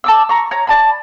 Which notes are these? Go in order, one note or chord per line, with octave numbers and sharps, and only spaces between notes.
A5 D6 E6
A#5 C#6
C#5 A#5
D5 A5 B5